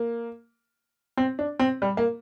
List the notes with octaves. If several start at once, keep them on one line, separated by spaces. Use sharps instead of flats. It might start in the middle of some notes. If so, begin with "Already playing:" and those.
Already playing: A#3
C4
D4
C4
G3
A#3